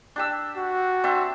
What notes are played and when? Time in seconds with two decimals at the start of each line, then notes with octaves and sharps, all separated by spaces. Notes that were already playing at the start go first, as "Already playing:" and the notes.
0.16 D4 G4 E6
0.57 F#4
1.04 C4 D4 E5